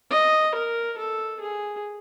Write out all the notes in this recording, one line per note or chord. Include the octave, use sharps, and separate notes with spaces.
D#5
A#4
A4
G#4